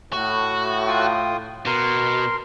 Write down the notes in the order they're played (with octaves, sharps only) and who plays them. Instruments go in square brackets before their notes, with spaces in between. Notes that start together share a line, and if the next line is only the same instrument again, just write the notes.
[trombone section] A2 [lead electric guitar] F#4
[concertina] F4 G5 D#6
[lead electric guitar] B2 [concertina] A#4 C6